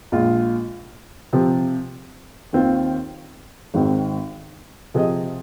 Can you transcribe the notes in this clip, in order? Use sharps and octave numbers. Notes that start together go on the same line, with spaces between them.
A#1 A#2 G#3 F4
C3 F3 C4
D#2 D#3 C4 F4
G#1 G#2 D#3 G#3 C4
C3 F3 C4 G#4 D#5